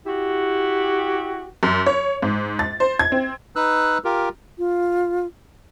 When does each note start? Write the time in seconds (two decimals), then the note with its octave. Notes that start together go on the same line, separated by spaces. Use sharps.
0.06 E4 F#4 G4
1.63 F#2
1.86 C#5
2.22 G#2
2.59 A6
2.80 C5
2.99 G#6
3.12 C4
3.56 D#4 B4 E6 F#6
4.04 F4 G4 A#4
4.58 F4